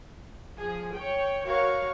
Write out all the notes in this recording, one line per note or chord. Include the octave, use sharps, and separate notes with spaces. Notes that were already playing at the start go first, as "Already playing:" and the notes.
F3 G#4
C#5 G5
F#4 A#4 C#5 F5 C#6